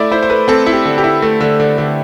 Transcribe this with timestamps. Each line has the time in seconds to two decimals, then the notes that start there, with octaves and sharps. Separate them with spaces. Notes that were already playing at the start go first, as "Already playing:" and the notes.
Already playing: A3 E4 D5 E5
0.11 E4 C5
0.23 C5
0.30 A3 B4
0.48 C4 A4
0.66 E4
0.73 G4
0.85 D3
0.98 G4
1.04 E4
1.22 A3
1.41 D3
1.60 D3
1.78 D3